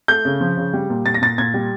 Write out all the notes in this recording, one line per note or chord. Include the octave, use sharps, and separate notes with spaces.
A3 G6
C#3
F3
C#3
G3
A#2
A#2 A6
A#6
A#2 A6
A#2 G#6
G3